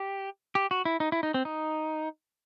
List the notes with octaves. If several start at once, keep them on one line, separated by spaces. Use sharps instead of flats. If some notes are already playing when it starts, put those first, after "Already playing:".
Already playing: G4
G4
F#4
E4
D#4
E4
D#4
C4
D#4